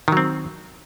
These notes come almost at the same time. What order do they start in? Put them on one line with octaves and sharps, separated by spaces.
D#3 F#3 C4